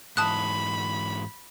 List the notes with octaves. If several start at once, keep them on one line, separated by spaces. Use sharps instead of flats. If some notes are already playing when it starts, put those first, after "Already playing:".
G#2 E3 A5 B5 D#6 F#6